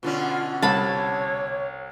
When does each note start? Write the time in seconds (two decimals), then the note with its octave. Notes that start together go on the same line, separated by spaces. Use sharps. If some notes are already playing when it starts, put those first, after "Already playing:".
0.03 B2 D3 C#4 F4
0.62 C2 C#5 A5 B5